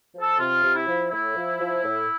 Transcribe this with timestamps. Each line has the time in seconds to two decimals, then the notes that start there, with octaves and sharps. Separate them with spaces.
0.15 F3
0.21 A4
0.39 C3 F4
0.63 C3
0.75 E4
0.87 F3
1.11 A2 E4
1.36 F3
1.60 F3
1.84 A2